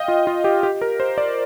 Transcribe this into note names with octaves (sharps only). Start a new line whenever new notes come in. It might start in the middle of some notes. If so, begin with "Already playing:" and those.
Already playing: D#5 F5 G5
F4
F4
G4
G4
A#4
C5
D5